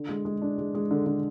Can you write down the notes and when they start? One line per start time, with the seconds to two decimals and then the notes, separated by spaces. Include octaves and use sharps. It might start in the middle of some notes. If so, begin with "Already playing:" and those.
Already playing: D3
0.09 G#3
0.25 G#3
0.42 D4
0.58 G#3
0.75 G#3
0.91 D3
1.06 D3